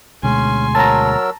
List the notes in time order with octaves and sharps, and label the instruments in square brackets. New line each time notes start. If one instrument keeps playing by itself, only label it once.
[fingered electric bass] D2 B2 G#3 [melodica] C#4 [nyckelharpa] G#5 C6
[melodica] F#3 A#4 E6 [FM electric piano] A5 A#5